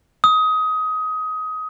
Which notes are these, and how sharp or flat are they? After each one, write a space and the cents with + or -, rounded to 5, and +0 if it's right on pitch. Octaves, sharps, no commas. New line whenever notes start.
D#6 +20